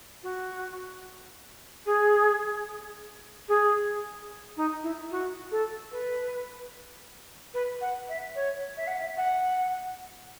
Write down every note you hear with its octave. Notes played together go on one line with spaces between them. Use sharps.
F#4
G#4
G#4
D#4
E4
F#4
A4
B4
B4
F#5
E5
C#5
E5
F#5
E5
F#5